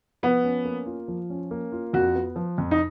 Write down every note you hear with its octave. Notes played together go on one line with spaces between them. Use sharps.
F3 B3
C#4
A#3
F4
F3
C#4
A#3
F4
F2 F#4
B3
F3
F2
D#4